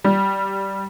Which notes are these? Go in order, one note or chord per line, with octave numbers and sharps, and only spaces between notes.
G3